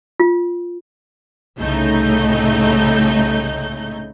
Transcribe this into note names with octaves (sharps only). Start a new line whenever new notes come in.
F4
C2 A2 C#3 A3 D#4 G6